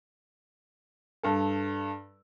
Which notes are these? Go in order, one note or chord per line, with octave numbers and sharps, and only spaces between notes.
G2 A4